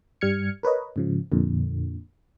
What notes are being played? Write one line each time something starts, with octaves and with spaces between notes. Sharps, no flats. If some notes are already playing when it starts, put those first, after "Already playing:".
G2 G3 F6 G#6 C#7
A#4 B4 C#5 D#5
G#2 C#3 F3
F2 A#2 D3